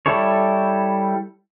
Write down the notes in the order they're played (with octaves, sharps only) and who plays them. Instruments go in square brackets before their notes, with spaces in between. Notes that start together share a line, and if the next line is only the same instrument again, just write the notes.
[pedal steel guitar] G3 E4 A4 C#5